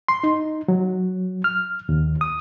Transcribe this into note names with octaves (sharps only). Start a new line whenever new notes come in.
C6
D#4
F#3
F6
D#2
D#6